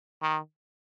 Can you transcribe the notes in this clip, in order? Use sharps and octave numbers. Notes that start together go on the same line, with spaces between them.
D#3